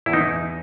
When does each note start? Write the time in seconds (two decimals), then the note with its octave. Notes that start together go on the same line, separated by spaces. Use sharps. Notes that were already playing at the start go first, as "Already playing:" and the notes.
0.06 E2 E4
0.13 D#4